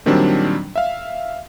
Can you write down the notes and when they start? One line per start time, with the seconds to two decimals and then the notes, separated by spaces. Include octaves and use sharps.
0.06 A#2 D#3 F#3 G3 C4 D4
0.76 E5 F5